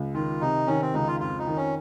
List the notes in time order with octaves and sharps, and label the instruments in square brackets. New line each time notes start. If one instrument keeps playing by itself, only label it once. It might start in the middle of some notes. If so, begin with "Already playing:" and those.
Already playing: [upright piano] C#2
[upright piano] D#3 [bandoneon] F4
[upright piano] C3 [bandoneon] D#4
[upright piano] D#3 [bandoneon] C#4
[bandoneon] C4
[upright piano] C#2 [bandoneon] D#4
[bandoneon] F4
[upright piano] F2 [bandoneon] F4
[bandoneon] D#4
[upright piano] D#3
[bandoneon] C#4